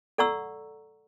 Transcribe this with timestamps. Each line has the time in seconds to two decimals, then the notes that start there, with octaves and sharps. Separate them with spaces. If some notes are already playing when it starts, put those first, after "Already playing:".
0.18 A4 D5 F#5 A#5 C#6 E6